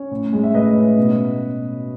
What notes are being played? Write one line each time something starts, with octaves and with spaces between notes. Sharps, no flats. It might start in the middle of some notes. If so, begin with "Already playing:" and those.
Already playing: C#4 C#5
A2
G#3
E5
A2 B4 D#5
C#4
B2